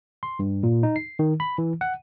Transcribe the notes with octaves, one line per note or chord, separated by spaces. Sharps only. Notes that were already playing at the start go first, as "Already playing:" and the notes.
C6
G2
A#2
D#4
C7
D#3
B5
E3
F#5